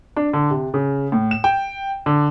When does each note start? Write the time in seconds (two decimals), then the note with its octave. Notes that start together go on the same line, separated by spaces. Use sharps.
0.16 D4
0.33 D3
0.50 C3
0.74 C#3
1.12 A2
1.31 E7
1.44 G5
2.06 D3